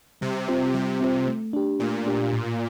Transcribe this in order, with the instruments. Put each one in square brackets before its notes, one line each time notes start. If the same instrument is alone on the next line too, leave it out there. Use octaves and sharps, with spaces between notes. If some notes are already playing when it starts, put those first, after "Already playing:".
[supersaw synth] C3 [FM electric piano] G3
[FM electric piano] C4 F4 C5
[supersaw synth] C3 [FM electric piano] G3
[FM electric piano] C4 F4 C5
A3
D4 G4
[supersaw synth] A#2 [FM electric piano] A3
[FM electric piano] D4 G4
A2